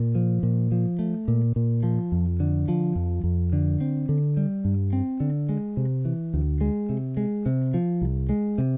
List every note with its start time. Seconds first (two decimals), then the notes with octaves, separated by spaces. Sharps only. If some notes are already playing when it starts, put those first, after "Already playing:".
Already playing: A#2
0.15 F3
0.43 A#2
0.72 F3
0.99 A3
1.28 A#2
1.56 A#2
1.83 F3
2.12 F2
2.40 D3
2.68 F3
2.96 F2
3.24 F2
3.53 D3
3.81 C4
4.09 D3
4.37 G3
4.65 G2
4.93 C4
5.20 D3
5.49 G#3
5.77 C3
6.05 E3
6.34 D2
6.61 G#3
6.89 C3
7.17 G#3
7.46 C3
7.74 F3
8.02 C2
8.29 G#3
8.58 C3